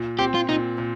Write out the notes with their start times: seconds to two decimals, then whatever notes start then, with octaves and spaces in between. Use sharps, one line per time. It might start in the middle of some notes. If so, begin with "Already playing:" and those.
Already playing: A#2
0.19 C4 G4
0.35 F4
0.49 A#2 D#4
0.78 A#2